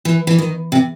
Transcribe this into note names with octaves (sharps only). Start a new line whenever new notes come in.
E3
E3
D#3
C3